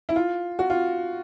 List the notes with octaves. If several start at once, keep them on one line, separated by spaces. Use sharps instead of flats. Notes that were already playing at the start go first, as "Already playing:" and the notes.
E4
F4
F#4
F4